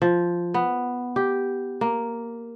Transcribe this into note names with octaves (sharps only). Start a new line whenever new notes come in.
F3
B3
G4
A#3